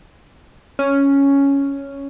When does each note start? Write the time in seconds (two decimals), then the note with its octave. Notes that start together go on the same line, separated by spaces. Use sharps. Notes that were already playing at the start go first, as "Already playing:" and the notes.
0.79 C#4